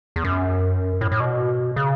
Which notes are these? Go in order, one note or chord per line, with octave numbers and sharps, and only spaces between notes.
E2
F#2
A2
A2
B2
C#3